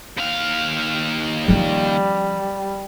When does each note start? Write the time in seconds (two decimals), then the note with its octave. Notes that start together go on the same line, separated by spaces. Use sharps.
0.18 D#2 F5
1.48 F3 G3 C#4